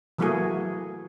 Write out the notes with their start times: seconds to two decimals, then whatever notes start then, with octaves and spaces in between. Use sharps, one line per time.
0.18 E3 F#3 A3 A#3 F#4 G#4